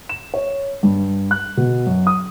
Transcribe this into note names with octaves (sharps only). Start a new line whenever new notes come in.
E7
C#5
G2
F#6
B2
F#2
D#6